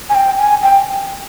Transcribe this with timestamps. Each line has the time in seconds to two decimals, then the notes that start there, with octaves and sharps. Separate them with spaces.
0.10 G#5
0.15 G5
0.38 G#5
0.62 G5